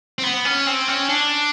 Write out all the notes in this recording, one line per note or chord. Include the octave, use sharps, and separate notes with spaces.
C4
B3
C#4
C4
C#4
D4